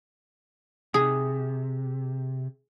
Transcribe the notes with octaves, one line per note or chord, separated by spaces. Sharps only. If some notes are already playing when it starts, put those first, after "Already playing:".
C3 G#4